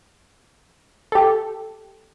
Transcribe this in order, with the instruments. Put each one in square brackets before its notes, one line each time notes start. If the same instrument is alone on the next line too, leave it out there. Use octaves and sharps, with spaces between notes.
[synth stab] G4 A4